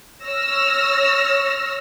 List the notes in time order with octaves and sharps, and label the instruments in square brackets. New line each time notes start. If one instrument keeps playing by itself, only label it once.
[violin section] C#5 E6 F6 A#6